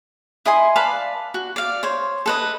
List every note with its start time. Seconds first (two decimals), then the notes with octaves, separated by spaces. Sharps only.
0.45 E4 D#5 G#5 C6
0.76 B4 D5 F5 A5
1.34 F#4
1.56 D5 F5
1.83 C5 C#5
2.26 A4 B4 D#5